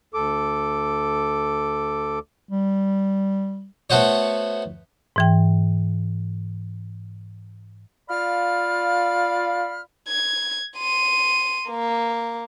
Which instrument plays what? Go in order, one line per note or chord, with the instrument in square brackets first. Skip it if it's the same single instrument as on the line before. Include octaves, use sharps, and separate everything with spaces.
[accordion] D2 A4 D6
[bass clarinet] G3
[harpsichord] A3 B3 F#4 C5 C#5
[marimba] G#2 E3 G5
[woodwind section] F4 D5 F5 B5 F6
[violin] G#6
C6 D#7
A#3